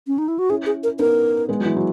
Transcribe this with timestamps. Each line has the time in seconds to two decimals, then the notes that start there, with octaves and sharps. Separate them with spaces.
0.07 C#4
0.18 D#4
0.28 E4
0.39 F#4
0.49 C#4 E4 G#4
0.66 G#4
0.83 A#4
0.99 B3 D#4 A#4
1.49 G#3 B3
1.60 F#3
1.65 E3 G#3
1.76 F#3